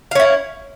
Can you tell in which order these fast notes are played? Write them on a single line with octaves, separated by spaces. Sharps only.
F5 C#4 E4